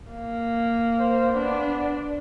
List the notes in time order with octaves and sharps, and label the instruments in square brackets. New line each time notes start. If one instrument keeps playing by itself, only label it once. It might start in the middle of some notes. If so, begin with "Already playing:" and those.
[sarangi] A#3
[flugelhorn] C5
[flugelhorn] B3 [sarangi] D4
[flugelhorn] D5